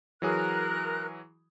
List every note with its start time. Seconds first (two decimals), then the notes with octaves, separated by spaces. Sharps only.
0.22 E3 F#3 G#4 A#4 F#6